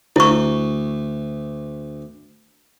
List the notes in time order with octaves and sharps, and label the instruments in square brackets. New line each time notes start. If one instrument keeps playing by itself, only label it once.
[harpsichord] D2 [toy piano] E4 C#6